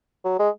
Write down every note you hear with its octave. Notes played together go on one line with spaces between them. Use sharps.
F#3
G#3